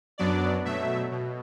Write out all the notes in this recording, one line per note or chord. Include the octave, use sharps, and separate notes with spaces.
F#2 F#3 B3 D4 D5
B2 F#3 A3 E5
B2